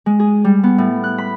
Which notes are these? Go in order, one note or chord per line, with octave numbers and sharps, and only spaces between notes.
G#3
G#4
G3
B3
A2
F#6
B5